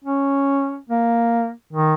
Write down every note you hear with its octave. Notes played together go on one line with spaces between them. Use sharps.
C#4
A#3
D#3